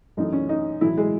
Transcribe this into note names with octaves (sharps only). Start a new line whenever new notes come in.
F#2 E3 A3 D#4
C#4
D#4
A2 E3 F#3 A3 E4
G#3 G#4